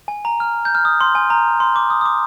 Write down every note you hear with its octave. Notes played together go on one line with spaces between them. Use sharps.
G#5
A#5
F6
G6
F6
D#6
C6
G#5
A#5
C6
D6
D#6
D#6
D6